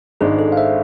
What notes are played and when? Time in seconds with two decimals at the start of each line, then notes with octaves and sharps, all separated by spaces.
0.21 G#1 G#2 G#3 D4 G#4
0.39 A4
0.52 F5
0.57 C5 E5